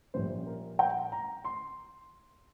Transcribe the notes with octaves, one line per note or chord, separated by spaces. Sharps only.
A#1 A#2 G3 C#4 C5
A#4
G5
A#5
C6